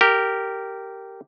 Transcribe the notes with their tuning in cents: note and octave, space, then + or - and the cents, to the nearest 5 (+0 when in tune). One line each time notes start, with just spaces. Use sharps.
G4 -10 A#4 -15